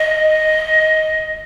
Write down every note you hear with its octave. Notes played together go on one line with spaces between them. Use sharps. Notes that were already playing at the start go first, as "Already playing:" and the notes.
Already playing: D#5